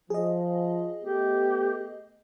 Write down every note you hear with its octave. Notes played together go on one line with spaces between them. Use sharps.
F3 G#4 D#5
A3 B3 G4